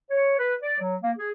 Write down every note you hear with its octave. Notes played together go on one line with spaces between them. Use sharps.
C#5
B4
D5
F#3
A#3
G#4